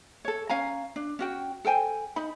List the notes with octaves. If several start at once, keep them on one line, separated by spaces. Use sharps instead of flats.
A4 C#5
C#4 F5 G#5 A#5
D4
C#4 F#4 G5
A4 C5 G5 G#5
D#4 B5